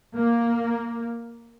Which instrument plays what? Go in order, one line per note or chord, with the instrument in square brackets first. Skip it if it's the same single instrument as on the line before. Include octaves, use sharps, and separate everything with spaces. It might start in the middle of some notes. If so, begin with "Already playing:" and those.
[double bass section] A#3